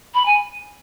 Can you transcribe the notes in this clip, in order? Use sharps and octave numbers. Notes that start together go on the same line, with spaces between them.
B5
G#5